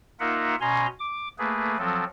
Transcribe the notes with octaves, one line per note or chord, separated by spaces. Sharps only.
A#3 D#4 F4 A#4 E5 F#5
B2 C#4 G#5 A#5 C6
D6
A3 A#3 G#4 B4
F3 F#3 C4 A4